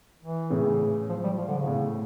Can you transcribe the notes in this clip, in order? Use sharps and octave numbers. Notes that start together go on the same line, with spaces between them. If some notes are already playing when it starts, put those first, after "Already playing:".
E3
A2 C#3
F3
G3
F3
D3
C#3
A2